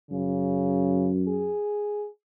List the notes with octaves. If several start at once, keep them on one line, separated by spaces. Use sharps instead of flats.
F#2 C#3
G#4